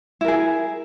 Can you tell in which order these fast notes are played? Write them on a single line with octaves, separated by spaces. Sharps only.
E4 A#4 G#4